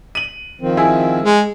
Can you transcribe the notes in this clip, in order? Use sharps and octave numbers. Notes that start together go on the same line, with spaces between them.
D#7 F#7
D#3 F3 C4
E4 G#4 G#5
G#3